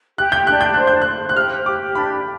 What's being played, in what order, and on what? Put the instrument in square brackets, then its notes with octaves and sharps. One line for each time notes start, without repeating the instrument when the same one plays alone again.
[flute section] G4 [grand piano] F#6
[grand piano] G6
[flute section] D4 [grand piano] F#6
[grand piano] G6
[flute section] C5 [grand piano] F#6
[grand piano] G6
F#6
[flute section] C5
[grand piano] F#6
[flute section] G4 [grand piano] F6
[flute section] G4 [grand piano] D6
[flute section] D4 [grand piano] B5